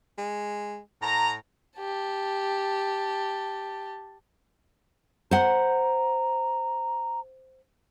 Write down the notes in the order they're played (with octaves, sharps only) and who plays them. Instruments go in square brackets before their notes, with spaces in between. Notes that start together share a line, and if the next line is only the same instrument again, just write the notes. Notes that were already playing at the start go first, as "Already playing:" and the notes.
[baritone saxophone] G#3
[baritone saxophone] A2 [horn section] A#5
[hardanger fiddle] G4 A5
[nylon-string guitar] C5 F#5 [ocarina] A#5